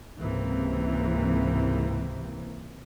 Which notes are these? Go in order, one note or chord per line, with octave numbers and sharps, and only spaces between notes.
C#2 G#2 C3 E3 A#3 C4